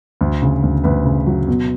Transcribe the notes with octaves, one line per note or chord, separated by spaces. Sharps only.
D2
C#3
D2
D2 B4
C#3
F#3
B2